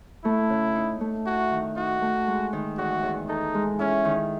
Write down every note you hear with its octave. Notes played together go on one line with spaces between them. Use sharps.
A3 E4
C#3
D#4
A3
E4 F#4
D#3
D#4 F#4
A3
G#3
D#3
E2 F#4
E2
D#4 A4
G#3
C#4 E4
D#3